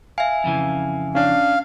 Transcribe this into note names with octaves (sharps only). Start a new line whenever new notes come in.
E5 F5 G#5
F2 C#3 E3
C#4 D4 F5